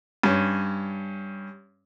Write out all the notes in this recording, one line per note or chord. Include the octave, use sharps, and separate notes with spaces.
G2 C#4